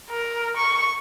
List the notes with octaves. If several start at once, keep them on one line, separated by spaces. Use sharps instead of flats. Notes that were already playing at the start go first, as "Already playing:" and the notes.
A#4
C#6